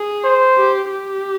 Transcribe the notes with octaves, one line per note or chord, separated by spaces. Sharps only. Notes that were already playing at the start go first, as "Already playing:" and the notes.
Already playing: G#4
C5
G4
G4